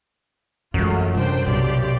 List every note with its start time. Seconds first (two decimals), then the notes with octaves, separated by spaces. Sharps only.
0.74 F#2 E3 F#3 G#3 A3 F4
1.14 C3 G3 D4 C5 G5
1.46 B1 C3 G4 D5 C6